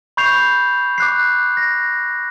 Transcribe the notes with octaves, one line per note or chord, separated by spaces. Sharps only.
B5 C#6 G6 C7 F7
D6 F#6 C7
A#6